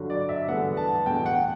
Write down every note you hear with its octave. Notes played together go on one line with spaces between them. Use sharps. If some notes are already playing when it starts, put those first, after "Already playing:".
Already playing: G2 D3 F#3
D5
E5
E2 D3 G3 B3 F#5
A5
E2 B2 A3 G5
F#5